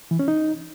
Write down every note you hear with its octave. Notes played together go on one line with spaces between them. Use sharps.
E3
C#4
D#4